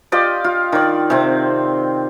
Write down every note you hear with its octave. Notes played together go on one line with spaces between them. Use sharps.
F4 G4 D5 D#5
F4
D#3 D5
C3 C4